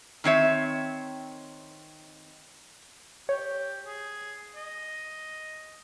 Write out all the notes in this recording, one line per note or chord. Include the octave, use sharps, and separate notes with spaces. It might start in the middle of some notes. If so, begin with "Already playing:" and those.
D#3 C4 C#5 E5
G4 C#5
G#4
D#5